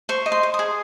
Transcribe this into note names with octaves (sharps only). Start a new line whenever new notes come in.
C5 C#6
D#5
C6
C5
D#6
G#4